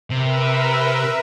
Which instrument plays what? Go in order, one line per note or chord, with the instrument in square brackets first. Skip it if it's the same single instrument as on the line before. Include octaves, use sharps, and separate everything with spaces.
[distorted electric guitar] C3 [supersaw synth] A#4 B4 E5